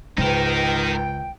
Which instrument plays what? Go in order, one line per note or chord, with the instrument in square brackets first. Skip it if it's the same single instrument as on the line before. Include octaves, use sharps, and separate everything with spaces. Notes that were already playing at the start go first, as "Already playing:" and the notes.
[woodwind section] C#2 G5 [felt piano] G#2 B4 [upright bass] C#3 [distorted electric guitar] D#4 A#4